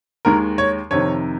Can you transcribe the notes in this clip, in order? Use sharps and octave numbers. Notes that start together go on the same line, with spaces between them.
D#2 D#3 G#3 A#4
C#5
F2 C3 D#3 C#5